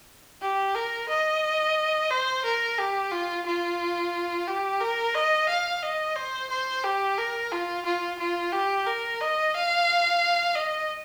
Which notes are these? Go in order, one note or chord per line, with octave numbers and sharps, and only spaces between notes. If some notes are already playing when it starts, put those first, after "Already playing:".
G4
A#4
D#5
C5
A#4
G4
F4
F4
G4
A#4
D#5
F5
D#5
C5
C5
G4
A#4
F4
F4
F4
G4
A#4
D#5
F5
D#5